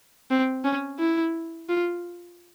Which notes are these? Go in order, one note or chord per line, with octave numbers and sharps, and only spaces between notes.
C4
C#4
E4
F4